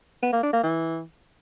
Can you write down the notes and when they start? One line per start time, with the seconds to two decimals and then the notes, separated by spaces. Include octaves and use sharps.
0.23 B3
0.33 A#3
0.43 D4
0.53 A#3
0.63 E3